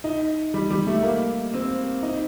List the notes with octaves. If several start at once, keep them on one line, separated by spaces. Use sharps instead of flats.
D#4
G3
G3
A3
A#3
C4
D#4